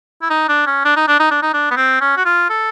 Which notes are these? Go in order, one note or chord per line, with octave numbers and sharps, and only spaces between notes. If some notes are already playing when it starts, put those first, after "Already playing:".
E4
D#4
D4
C#4
D4
D#4
D4
D#4
D4
D#4
D4
B3
C4
C#4
F#4
F4
A4